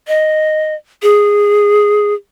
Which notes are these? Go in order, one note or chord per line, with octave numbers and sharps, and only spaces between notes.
D#5
G#4